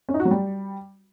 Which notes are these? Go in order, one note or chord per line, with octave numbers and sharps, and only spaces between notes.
C#4
D#4
F#4
F#3
G3